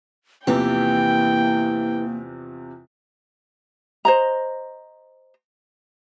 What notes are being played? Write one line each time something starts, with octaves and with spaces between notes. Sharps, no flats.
E2 C3 E3 F3 A#3 G4 G5
C5 D#5 A#5